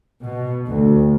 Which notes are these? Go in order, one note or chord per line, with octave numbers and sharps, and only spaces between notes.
B2
D2